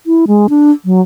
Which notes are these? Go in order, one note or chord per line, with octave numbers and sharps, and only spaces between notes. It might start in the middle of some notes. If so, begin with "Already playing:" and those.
E4
G#3
D4
F#3